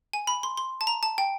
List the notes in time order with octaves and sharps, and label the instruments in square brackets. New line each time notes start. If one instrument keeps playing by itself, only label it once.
[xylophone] G#5
B5
C6
C6
A5
A#5
A5
G5